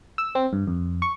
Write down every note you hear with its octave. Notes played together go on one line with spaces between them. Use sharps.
E6
C4
G2
F2
C#6